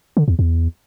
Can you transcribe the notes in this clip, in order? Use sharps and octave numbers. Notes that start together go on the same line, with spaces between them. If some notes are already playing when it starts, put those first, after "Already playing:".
D3
E2
E2